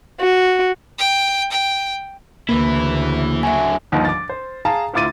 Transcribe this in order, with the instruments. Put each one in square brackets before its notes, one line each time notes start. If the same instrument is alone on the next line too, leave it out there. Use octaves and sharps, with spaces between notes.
[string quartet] F#4
[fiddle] G5
G5
[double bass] D2 C#3 [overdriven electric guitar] E3 E4 [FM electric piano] A#3
[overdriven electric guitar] D3 F#3 [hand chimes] E5 G#5
[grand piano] G1 D#2 F3 D#5
D6 A6
C5
G#4 F5 A5 A#5
D2 E4 F4 D6 A6 D#7